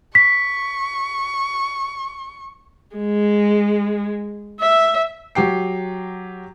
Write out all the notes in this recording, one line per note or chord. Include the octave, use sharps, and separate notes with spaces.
C#6 B6
G#3
E5
F#3 G4 G5 C7